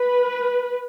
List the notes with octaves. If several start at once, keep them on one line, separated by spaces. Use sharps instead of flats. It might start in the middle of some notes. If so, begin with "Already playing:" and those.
Already playing: B4